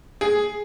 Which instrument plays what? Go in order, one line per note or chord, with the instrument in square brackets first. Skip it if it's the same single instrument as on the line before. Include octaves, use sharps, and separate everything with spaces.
[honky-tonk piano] G#4